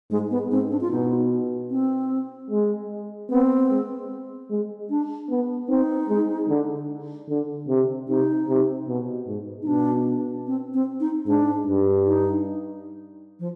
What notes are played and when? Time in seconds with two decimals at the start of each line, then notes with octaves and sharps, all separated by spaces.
0.10 G#2 G#3
0.31 B3
0.50 G#2 C4
0.71 D4
0.81 F4
0.91 B2 D#4
1.70 C4
2.50 G#3
3.30 B3 C4
3.70 G#3
4.50 G#3
4.90 D4
5.30 B3
5.68 C4 D#4
6.09 G#3
6.49 D3
7.29 D3
7.68 C3
8.09 C3 D#4
8.48 C3
8.88 B2
9.28 G#2
9.62 D#4
9.67 B2 D4
10.47 C4
10.74 C4
11.00 D#4
11.27 G#2 D4
11.67 G2
12.07 D#4
13.40 F3